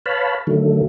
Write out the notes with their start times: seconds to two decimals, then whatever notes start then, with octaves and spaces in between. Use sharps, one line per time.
0.06 B4 C#5 F5 A5 B5
0.47 D3 D#3 F#3 A3